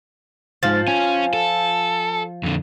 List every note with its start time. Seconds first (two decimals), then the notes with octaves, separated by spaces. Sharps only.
0.63 G#2 F3 F6 A6
0.88 C#4 G#5
1.33 A4
2.43 F2 D3